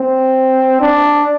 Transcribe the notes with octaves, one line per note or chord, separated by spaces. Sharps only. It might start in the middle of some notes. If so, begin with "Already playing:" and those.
Already playing: C4
D4